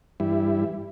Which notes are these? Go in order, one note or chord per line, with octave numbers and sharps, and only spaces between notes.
G2 E3 G3 E4